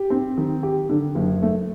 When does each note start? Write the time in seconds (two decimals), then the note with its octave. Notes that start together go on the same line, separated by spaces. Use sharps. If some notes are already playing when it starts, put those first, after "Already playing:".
Already playing: G4
0.10 C4
0.37 D#3
0.63 G4
0.89 D3
1.15 F#1
1.42 A3